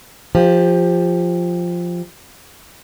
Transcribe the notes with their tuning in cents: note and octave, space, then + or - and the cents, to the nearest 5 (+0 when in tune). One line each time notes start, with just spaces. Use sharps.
F3 +0 G4 +20